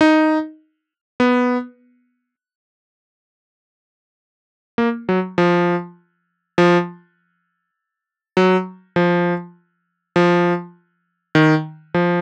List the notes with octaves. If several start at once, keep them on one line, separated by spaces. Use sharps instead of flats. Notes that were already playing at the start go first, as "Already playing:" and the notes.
D#4
B3
A#3
F#3
F3
F3
F#3
F3
F3
D#3
F3